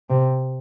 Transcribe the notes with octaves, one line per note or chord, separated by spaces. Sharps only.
C3